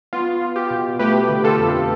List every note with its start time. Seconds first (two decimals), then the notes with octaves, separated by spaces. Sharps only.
0.13 B3 F4
0.41 B3
0.56 G4
0.71 B2
0.99 A3 G4 B4
1.29 D3
1.44 F4 A4
1.59 F2